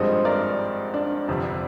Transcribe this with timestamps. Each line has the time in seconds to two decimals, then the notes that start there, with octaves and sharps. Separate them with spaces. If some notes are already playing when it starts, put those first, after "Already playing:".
Already playing: G#1 G2 F3 G#3 C4 C5 D#5
0.25 A#4 D5
0.94 D4
1.28 G1 F2 C3 G3